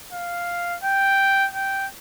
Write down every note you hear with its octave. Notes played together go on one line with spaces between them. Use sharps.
F5
G5
G5